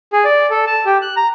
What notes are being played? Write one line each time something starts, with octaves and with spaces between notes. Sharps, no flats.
G#4
D5
A4
A5
G4
F#6
A#5